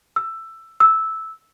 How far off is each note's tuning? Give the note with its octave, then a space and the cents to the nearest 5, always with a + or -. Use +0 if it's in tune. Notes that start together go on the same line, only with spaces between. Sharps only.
E6 +10
E6 -10